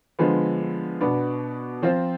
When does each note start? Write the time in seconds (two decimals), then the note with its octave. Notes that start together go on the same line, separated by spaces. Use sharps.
0.19 D3 F3 G#3 B3
1.01 B2 B3 D4
1.82 F3 C4 F4 C5